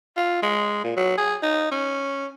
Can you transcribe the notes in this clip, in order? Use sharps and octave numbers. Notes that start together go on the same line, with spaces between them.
F4
G#3
A#2
F#3
G#4
D#4
C#4